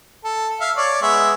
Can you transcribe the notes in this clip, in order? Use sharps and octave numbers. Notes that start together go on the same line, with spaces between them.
A4
E5 F5
C#5 D5
G#3 B3 E5